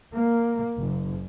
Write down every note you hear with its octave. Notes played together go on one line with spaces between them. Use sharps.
A#3
F#1